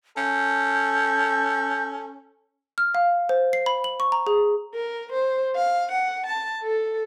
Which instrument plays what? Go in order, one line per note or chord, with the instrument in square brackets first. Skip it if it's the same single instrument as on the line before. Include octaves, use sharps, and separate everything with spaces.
[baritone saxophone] C#4 [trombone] A4 [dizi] G6
[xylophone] F6
F5
C5
C7
B5
F#7
C#6
A#5
G#4
[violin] A#4
C5
F5
F#5
A5
A4